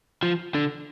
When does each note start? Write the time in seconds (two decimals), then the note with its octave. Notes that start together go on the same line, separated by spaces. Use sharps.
0.23 F3
0.55 D3